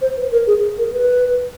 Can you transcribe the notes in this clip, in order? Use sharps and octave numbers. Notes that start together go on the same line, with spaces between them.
C5
B4
A#4
G#4
A#4
B4